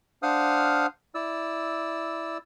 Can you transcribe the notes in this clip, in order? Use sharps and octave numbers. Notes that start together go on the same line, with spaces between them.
D4 C5 F5 F#5 D#6 F6
E4 D5 E6